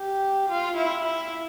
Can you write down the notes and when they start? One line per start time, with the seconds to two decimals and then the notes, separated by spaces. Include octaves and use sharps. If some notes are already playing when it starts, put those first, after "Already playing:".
Already playing: G4
0.49 F4
0.77 E4
1.06 E4